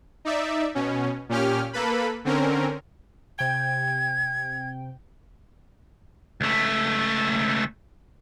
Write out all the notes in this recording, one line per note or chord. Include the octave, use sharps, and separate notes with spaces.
D#4 D5 E5
B2 C#4
A#2 C#4 G4 F6
A#3 A4 B4 B5
D3 C4 C#4 A#4
C3 G5 G#6
C#2 A3